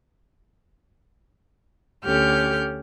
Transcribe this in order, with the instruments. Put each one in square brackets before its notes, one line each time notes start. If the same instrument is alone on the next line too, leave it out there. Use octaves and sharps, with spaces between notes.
[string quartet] D2 C#4 G4 A4 F6 G6